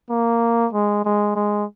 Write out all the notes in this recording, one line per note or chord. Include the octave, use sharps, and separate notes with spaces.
A#3
G#3
G#3
G#3